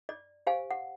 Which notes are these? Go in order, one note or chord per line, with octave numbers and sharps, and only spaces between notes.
D5
G4 C5 F5 G#5
F#5